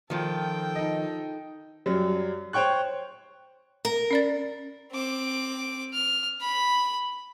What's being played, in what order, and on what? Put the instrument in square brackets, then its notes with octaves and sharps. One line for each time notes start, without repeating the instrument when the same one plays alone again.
[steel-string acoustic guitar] D#3 F3 [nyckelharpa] A4 G5
[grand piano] D#4 D#5
[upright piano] F#2 F#3 G3
C5 C#5 G5 C#6 F#6
[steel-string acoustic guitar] A#4
[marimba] C#4 D5 A6
[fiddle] C4 D6
F6
B5